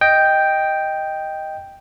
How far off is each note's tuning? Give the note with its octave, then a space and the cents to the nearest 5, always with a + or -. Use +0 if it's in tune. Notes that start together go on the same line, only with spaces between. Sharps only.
D#5 +0 G5 +0